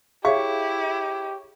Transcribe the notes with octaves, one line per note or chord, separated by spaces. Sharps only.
E4 G4 G#4 C#5 E5 F5 C#6